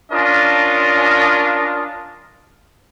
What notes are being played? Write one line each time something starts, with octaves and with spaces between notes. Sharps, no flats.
C#4 D4 F4 A#4 D#5